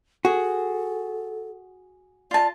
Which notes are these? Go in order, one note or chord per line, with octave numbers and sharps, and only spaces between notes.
F#4 G#4 A4
F4 D5 A5